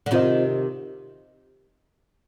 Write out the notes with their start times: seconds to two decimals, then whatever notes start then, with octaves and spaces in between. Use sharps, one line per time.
0.06 D3
0.11 C3 D#3 C4 F4 C5 D#5